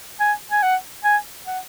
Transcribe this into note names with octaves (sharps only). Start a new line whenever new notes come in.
G#5
G#5
F#5
G#5
F#5